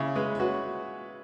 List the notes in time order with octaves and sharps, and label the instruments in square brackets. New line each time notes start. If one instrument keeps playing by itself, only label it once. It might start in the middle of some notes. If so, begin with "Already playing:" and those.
Already playing: [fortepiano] C#3 [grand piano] E4
[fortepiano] G#3 [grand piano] B4
[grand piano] C#5
[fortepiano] F#4 [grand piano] B4